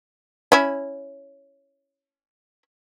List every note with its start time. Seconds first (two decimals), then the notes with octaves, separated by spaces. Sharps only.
0.52 C#4 E4